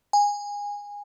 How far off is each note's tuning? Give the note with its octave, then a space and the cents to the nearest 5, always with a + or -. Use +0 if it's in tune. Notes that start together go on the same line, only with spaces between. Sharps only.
G#5 -20